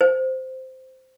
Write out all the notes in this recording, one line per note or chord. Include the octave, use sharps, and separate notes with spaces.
C5